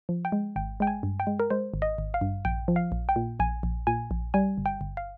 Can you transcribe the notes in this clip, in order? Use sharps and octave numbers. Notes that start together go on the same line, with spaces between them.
F3
G5
G#3
G#1 G5
G#3 G5
G#5
G2
G5
G#3
A#4
G#3 C5
G#1
D#5
G#1
F5
G2
A#1 G5
F3
F5
A#1
G5
A#2
A#1 G#5
A#1
A#2 G#5
A#1
G3 G#5
G1
G5
G1
F5